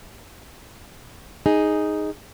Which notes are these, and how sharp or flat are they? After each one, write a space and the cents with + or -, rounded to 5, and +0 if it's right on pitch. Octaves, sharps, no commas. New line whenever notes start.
D#4 +0 G#4 +0